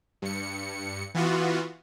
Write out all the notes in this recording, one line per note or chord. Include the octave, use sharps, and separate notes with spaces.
G2 C#7
E3 B3 F4 F#4